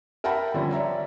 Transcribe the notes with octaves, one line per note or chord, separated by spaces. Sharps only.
A#4 E5 F#5 G5 A5 B5
D3 F3 G3 C#4
C#5 D5 E5 A#5